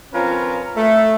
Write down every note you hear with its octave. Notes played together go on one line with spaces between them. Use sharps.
F3 C4 C#4 F4 A#4 B4
A3